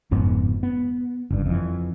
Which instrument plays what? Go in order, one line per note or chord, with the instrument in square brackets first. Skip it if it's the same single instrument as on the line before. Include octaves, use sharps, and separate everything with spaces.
[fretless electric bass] F#1 F2 G#2 B3
B3
F#1 G2
F2 E3